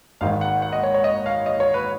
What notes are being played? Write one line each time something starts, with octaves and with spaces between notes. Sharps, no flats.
G#1 G#2 D#3 F5
F#5
F#5
D#5
C#5
C#5
D#5
F5
D#5
C#5
B4